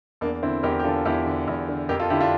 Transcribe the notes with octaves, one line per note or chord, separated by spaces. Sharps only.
E2 A#3 D4
D3 C4 E4
E2 G4 A#4
G4
D3 F4 A4
E2 E4 G4
D3
E2
D3
F2 G4 A#4
F4 A4
D3 E4 G4
D4 F4